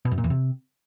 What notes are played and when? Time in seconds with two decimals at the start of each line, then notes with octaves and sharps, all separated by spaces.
0.05 B2
0.11 F#2
0.18 A#2
0.24 E2
0.30 C3